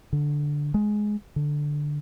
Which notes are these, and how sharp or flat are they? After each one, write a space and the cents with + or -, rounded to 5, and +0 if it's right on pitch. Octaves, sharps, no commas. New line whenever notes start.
D3 -5
G#3 +10
D3 +5